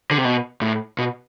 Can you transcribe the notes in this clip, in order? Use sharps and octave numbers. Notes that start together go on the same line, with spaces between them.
D3
C3
B2
A2
B2